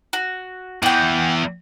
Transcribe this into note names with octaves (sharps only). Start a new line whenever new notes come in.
F#4
E2 E3 F#5 G5